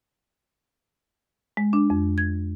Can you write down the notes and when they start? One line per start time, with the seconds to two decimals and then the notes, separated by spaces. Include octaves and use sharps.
1.57 G#3
1.73 D4
1.90 F2
2.18 G#6